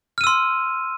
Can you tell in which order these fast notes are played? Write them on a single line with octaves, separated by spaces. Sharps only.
F6 D#7 E6 C6